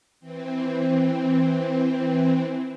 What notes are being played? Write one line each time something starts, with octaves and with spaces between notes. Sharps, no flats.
E3 C4